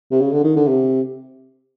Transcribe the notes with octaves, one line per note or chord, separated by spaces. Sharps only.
C3
C#3
D3
D#3
D3
C3